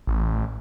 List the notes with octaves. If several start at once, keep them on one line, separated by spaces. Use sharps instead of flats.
A1